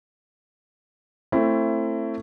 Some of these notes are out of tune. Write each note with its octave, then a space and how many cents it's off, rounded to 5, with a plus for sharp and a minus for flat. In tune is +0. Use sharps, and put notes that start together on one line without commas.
A3 +25 C4 +20 E4 +20